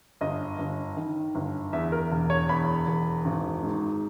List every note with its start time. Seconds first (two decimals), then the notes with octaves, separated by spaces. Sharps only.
0.21 G1 D#5
0.59 G1
0.97 D#3
1.35 G1
1.73 E2 E5
1.92 A#4
2.12 E1
2.30 C#5
2.49 E2 B5
2.87 E1
3.25 G#1
3.63 G#2